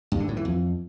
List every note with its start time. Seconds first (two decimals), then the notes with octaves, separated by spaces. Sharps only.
0.12 G2
0.20 D3
0.28 A2
0.37 E3
0.45 F2